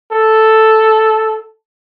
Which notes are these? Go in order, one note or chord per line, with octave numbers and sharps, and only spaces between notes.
A4